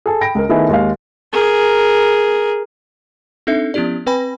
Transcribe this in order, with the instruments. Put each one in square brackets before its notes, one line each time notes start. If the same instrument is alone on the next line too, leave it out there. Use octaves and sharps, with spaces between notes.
[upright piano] G#4 A4
G5 B5 A#6 D7
C#2 A#4
D#3 A3 B3 D#4 E4 G#4
D#2 G#3 D#5 F5
[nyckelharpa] G#4 A#4
[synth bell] C4 D4 D#4 A4 E5
F3 B3 C#4 E4 G4 D5
C4 B4 G5 G#5 B5 A#6